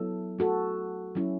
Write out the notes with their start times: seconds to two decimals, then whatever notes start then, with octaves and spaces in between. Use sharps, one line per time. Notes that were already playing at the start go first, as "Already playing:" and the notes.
Already playing: F#3 B3 E4 A4
0.39 A3 F#4 A4
1.15 F#3 C#4 E4